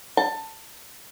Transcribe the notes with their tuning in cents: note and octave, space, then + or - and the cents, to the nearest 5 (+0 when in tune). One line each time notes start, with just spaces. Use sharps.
A5 +20